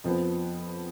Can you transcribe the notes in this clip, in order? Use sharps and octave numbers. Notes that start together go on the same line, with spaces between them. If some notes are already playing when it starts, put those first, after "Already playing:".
F2 F3 B3